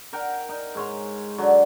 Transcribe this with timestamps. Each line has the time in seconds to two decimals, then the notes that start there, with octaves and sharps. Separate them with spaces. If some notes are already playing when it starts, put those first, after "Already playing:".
0.13 A#4 F#5 G5
0.49 D#4
0.75 G#2 C#5 C6
1.38 D3 F#3